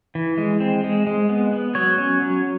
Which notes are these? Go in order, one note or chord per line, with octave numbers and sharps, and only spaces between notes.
E3
G#3
C4
G#3
G#3
B3
B3
F#3 C#5
C#4
F#3